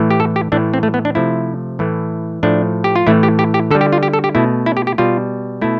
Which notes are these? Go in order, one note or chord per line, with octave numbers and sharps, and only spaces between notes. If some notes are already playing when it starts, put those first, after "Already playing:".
Already playing: A2 E3 A3
G4
A4
G4
A2 E3 A3 D4
C4
A3
B3
D4
C3 F3 A3 E4
A2 E3 A3
A2 F3 A3 D4
G4
F4
A2 E3 A3 E4
G4
G4
G4
D3 G3 A4
G4
F4
G4
A4
G4
B2 A3 E4
E4
G4
G4
B2 G3 F4
B2 A3 E4